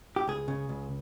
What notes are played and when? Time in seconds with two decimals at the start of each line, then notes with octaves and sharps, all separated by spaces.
0.16 G4
0.28 C#2 G#4
0.48 C#3
0.69 C#2